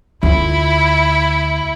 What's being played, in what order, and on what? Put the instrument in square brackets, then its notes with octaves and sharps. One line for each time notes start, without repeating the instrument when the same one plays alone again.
[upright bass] D2 F4 [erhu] E4